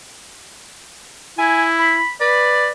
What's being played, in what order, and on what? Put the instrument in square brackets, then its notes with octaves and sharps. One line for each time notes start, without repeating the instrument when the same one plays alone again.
[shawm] E4 [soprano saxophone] G#5
[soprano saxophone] B5
[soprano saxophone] B4 [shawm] D5